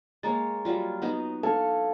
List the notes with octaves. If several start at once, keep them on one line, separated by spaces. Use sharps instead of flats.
G#3 A#3 C#5 A#5 A6
F#3 G3 F4
F#3 B3 D#4
A4 C#5 F5